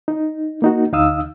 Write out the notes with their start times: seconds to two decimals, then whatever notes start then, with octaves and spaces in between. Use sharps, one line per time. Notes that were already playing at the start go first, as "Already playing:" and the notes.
0.08 D#4
0.62 A#3 D#4 F#4
0.92 D2 D#4 F5 D#6 E6